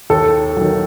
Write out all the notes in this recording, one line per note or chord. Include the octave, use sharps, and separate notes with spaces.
D#2 A4
D#3 F#3